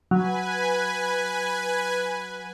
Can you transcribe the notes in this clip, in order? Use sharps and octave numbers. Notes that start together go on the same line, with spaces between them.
F#3 B4 G#5